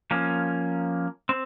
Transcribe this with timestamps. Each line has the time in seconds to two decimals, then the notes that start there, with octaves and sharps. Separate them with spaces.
0.11 F3 A#3 C#4
1.29 C4